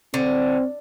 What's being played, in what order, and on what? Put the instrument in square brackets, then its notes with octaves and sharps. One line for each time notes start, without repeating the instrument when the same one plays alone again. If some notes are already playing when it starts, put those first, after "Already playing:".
[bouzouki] D3 [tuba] C4